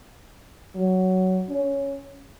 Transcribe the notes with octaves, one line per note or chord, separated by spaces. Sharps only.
F#3
C#4